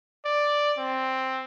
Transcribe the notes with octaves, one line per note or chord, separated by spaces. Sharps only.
D5
C4